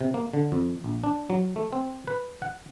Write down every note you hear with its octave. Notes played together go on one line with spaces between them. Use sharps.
C3
A#3
D3
F2
A#1
D4
F#3
A3
C4
B4
F#5